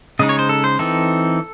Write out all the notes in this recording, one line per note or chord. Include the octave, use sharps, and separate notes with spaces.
C#3 G#3 D#4 D#5
C#5
C5
A4
C5
E3 C4 D#4 A4